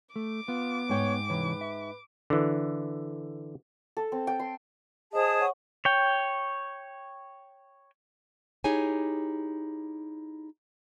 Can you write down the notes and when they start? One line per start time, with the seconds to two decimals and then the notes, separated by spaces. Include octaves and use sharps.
0.16 A3 D6
0.48 B3 F4
0.89 G#2 C#5 G5
1.30 C2 E3 B4 C#5
1.61 E5
2.30 D3 E3
3.97 A4
4.12 C4
4.27 G5
4.40 C6
5.13 G#4 C5 D#5 A5 D#6
5.40 C#5 F#5 C#6
5.85 C#5 G5
8.64 D#4 E4 G4 G#4 C#5 G#5